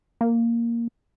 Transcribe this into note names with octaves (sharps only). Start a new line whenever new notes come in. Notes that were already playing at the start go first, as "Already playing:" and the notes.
A#3